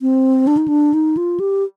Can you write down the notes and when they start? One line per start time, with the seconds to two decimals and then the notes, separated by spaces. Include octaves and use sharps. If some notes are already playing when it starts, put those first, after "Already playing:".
0.01 C4
0.47 D4
0.57 D#4
0.68 D4
0.94 D#4
1.17 F4
1.40 G4